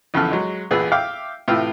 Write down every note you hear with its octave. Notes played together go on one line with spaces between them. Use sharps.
A#1 E2 C#3 A4 F6
F#3 G#3
A1 E2 A#2 G#4 B4 E6
E5 F5 G5 D6 F6
A2 C3 E3 F4 G5 E6